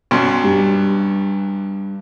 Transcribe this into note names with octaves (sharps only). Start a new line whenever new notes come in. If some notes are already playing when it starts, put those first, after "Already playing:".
B1 F#2 C6
G2